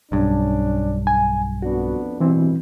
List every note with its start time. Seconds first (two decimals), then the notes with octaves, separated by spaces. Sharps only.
0.12 B1 G2 C#4 D4
1.07 G#5
1.62 F2 B3 D4 F#4
2.20 A1 G2 B2 E3 C4 E4